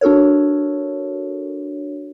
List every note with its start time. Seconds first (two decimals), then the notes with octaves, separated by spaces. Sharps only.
0.01 D4 F#4 A4 A#4 C#5